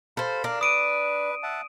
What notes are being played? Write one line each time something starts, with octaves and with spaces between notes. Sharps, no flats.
A4 C5 F5 B5
D4 A#4 F5
B4 D#6 D7 D#7
E5 F#5 A5